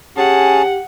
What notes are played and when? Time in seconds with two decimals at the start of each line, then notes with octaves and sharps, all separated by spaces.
0.17 C#4 G4 G#4 F#5 A5